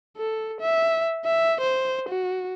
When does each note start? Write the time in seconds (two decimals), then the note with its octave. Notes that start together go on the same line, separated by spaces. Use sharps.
0.17 A4
0.61 E5
1.25 E5
1.60 C5
2.09 F#4